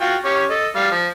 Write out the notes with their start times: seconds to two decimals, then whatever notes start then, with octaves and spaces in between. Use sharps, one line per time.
0.01 F4 F#4 G5
0.25 C#4 G4 C#5
0.50 A4 D#5
0.76 G3 F5
0.91 F3